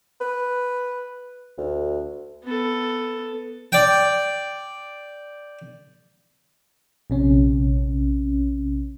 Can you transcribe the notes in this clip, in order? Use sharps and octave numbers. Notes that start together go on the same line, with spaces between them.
B4
D2
B3 A4
D5 G5
A#1 C3 C#4